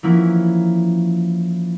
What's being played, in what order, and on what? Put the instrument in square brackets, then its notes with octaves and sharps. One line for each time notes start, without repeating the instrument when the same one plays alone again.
[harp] E3 F3 A#3 C#4 E4